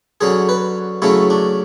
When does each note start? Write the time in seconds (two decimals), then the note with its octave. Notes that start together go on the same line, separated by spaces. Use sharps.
0.21 D3 F#3 C#4 G#4
0.49 B4
1.02 C#3 F#3 A3 C#4 E4
1.30 D4